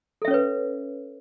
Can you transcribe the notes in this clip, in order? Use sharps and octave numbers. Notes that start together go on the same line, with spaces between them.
C#4 A4 B4 C#5 E5